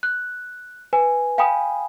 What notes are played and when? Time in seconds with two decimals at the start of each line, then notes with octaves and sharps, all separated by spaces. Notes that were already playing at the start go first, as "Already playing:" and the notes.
0.03 F#6
0.93 B4 G#5
1.38 F5 G5 G#5 B5 D#6